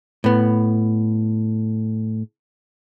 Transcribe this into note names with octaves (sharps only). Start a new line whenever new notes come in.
A2 B3